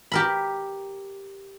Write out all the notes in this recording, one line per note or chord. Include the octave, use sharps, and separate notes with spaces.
G4 A#4 B5